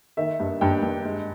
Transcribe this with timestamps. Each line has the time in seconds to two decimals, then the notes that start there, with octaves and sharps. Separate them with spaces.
0.17 D#3 E5
0.40 G2
0.61 G2 G5
0.83 G2
1.04 G#3